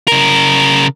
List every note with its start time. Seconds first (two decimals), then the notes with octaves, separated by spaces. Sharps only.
0.08 C#3 A#4